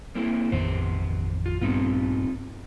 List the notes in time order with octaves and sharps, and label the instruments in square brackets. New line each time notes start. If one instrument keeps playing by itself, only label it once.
[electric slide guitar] A#3 C4 E4
[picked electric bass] A1 F2 D#3 [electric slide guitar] B2 B3 C5
[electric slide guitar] F4
[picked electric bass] A#1 G2 B3 [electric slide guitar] C4 D#4 F4